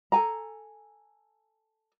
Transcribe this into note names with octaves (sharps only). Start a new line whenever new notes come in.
A4 G#5 A#5